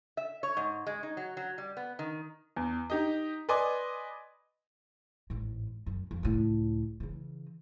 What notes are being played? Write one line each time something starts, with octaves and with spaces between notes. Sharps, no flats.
E5
C#5
G#2
G#3
D#4
F#3
F#3
G3
B3
D#3
E2
D#4 G4 D#5
B4 D5 D#5 G#5 C6 D6
A1 G#2
F#2
F2
C#2 A2
C#3 E3